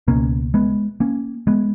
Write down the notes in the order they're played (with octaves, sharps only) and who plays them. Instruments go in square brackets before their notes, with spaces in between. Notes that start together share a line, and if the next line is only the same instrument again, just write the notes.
[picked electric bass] C#2 B2 A#3 C#4
G#3 B3
A#3 C#4
G#3 B3